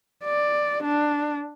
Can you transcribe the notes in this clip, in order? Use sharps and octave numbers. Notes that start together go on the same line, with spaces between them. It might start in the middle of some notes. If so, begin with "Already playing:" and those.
D5
D4